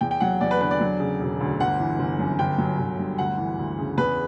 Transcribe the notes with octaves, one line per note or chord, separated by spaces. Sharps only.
E2 G5
G5
F#3 F#5
E2 D5
B4
D3 B4
D5
F#3
C#3
E1
D2
G1 F#5
E3
G1
F#2
G1 G5
F#3
G1
G2
D2 F#5
E3
D2
C#3
E2 B4